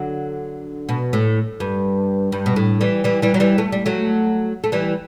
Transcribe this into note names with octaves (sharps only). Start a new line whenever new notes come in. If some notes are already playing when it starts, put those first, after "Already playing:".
Already playing: D3 F#3
B2
A2
G2
G2
B2
A2
E3 G3
E3 G3
E3 G3
F#3
E3 G3
A3
G3
F#3 A3
A3
E3 G3